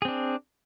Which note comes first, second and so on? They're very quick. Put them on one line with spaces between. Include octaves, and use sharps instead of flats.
G#4 C4 D4